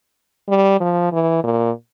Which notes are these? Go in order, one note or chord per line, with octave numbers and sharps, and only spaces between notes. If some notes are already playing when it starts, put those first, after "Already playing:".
G3
F3
E3
A#2